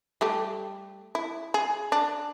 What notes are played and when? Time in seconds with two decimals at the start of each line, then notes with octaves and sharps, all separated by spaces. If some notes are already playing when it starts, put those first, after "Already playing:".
0.21 G3 A3 G4
1.15 E4
1.54 G#4
1.92 D4